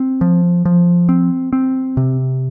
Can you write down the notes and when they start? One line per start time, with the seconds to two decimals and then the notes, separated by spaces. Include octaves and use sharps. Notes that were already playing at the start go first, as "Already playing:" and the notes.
Already playing: C4
0.21 F3
0.65 F3
1.09 C4
1.53 C4
1.97 C3